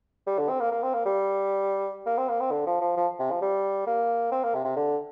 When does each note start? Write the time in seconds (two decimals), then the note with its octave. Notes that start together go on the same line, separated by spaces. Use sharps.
0.27 G3
0.39 D3
0.49 C4
0.60 A#3
0.72 A#3
0.83 C4
0.94 A#3
1.05 G3
2.06 A#3
2.18 C4
2.29 A#3
2.41 C4
2.51 D3
2.66 F3
2.81 F3
2.97 F3
3.19 C3
3.31 F3
3.42 G3
3.87 A#3
4.32 C4
4.43 A#3
4.55 C3
4.65 C3
4.76 D3